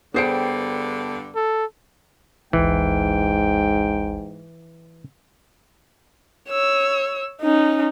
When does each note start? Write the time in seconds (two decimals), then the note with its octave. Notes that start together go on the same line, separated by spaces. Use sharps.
0.14 G2 D3 B3 G#4 C5 G5 C7 C#7
1.35 A4
2.53 G#1 D2 G#2 E3 G5
6.49 C#5 E6
7.42 C#4 D#4